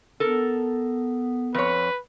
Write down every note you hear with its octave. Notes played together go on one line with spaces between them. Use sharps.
B3 A4 A#4
F2 B4 C#5